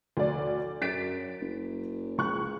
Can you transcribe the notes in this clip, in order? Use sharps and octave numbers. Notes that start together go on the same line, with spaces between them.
D2 D5
F#2 A6 B6 D7
F#1
C#2 C#6 F#6